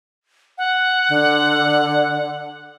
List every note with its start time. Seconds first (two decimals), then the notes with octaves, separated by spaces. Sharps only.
0.58 F#5
1.09 D3